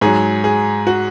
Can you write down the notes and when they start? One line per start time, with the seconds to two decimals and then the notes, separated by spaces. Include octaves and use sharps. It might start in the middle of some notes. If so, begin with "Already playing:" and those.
0.01 G#2 F#3 G#4
0.44 G#4
0.87 F#4